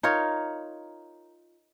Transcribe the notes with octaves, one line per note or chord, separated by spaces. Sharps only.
D#4 F4 A#4 C#5